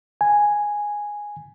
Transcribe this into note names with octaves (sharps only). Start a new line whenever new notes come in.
G#5